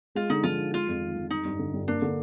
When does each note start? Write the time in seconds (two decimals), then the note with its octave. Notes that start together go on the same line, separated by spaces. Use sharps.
0.15 G#3 F4
0.30 D3 D#4
0.43 F3 F4
0.59 D#4
0.73 G#3 F4
0.88 F2
1.01 D#3
1.16 F2
1.30 G3 D#4
1.45 G2
1.59 D3
1.73 G2
1.88 A#3 D4
2.02 D3